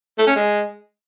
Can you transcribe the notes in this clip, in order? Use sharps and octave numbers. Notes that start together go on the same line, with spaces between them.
A3
C#4
G#3